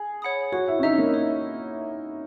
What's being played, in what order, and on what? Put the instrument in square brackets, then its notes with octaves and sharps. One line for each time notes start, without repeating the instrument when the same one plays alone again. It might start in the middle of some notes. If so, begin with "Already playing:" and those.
Already playing: [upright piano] G#4
[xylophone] C#5 F#5 B5 D#6
[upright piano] F#4 [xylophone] C#5
[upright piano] E4
C#4
[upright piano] D#4 [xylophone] E5 A#5 E6
[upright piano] A#3
[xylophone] C#5